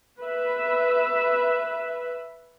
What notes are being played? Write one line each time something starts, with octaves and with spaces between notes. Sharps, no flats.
B4 E5